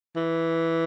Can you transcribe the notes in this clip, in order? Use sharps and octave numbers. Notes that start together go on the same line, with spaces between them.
E3